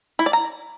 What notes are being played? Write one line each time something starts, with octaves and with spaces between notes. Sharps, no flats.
E4
D5
A#5